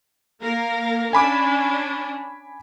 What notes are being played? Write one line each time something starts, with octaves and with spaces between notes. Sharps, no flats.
A#3 A#4 F5
C#4 D4 G#5 B5 D6